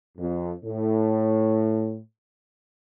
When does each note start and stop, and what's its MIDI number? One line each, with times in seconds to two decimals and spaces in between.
0.17 0.52 41
0.63 1.99 45